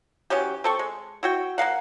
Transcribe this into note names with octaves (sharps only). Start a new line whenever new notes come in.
E3 F#3 C#4 G4
C4 A4 C#6
G#3
E4 F#4 G5
A#3 A#4 F5 F#5